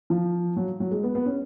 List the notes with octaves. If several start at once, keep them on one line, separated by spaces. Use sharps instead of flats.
F3
F#3
F#3
G#3
B3
B3
C#4